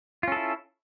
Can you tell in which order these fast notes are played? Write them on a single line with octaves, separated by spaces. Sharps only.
F4 C#4 A4 E4